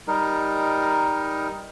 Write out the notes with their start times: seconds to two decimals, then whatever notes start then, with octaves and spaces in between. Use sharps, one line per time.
0.08 G3 D#4 A#4